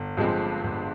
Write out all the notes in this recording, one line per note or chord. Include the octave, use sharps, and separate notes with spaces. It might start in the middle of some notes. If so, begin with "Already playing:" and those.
Already playing: G1
G2 F3 G#3 C4
G1